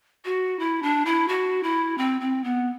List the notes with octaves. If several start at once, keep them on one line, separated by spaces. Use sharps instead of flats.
F#4
E4
D4
E4
F#4
E4
C4
C4
B3